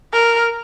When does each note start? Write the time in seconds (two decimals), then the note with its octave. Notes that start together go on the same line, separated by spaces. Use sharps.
0.13 A#4